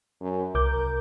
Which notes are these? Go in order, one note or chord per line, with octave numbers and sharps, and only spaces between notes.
F#2
C2 A#4 D6 G6